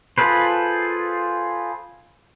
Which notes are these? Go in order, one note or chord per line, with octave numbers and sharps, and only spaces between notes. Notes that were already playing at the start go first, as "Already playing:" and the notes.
F4 G#4 A4 B4 C5